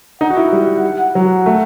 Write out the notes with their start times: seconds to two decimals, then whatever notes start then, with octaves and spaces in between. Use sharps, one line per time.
0.21 D#4 F#5
0.30 F#4
0.37 E4
0.52 G3
1.15 F#3 F#5
1.46 A3